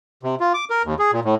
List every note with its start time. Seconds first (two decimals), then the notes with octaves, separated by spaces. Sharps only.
0.23 C3
0.40 F4
0.54 D6
0.70 A#4
0.85 D#2
0.99 G#4
1.13 A#2
1.25 A2